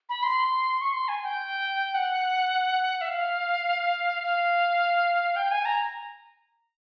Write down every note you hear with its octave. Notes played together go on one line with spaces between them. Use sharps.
B5
C6
C#6
C6
G#5
G5
F#5
E5
F5
F5
G5
G#5
A#5